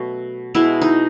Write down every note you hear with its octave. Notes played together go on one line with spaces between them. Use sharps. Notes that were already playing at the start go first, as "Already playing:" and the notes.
Already playing: B2 F#3 A3 F#4
B2 G#3 B3 E4
D#4